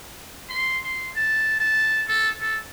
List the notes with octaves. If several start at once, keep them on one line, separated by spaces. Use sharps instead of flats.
C6
C6
A5
A5
A4
A4